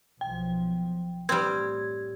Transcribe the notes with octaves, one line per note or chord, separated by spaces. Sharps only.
B1 F3 G5
A2 G3 C4 G#6